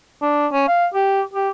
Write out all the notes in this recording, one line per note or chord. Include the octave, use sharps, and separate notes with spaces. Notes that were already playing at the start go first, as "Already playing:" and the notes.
D4
C#4
F5
G4
G4